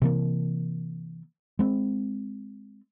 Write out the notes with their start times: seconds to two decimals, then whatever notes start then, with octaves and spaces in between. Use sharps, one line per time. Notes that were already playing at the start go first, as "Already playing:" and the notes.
0.02 C3 E3 A#3
1.59 G#3 C4